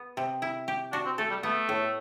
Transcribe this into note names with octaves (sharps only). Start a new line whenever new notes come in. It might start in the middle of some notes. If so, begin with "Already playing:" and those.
Already playing: B3
C3
E4
G4
D4 F#4
C4
A3 A4
G3
A3 B3
A2